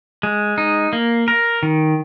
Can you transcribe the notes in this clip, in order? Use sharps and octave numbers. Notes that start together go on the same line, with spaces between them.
G#3
D#4
A#3
A#4
D#3